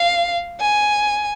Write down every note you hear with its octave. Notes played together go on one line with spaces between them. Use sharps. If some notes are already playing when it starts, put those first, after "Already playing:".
Already playing: F5
G#5